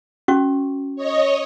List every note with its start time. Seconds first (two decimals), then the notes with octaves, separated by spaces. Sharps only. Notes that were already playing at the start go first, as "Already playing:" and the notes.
0.28 C#4 F#4 C#6
0.96 C#5 D#5